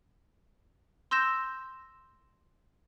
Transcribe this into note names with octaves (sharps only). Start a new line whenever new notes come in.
C6 E6 G6 A#6 E7